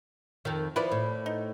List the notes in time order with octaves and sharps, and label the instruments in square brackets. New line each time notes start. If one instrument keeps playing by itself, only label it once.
[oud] F2 D#3
[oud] F3 [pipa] E4 B4 D5
[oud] A2
[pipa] D#4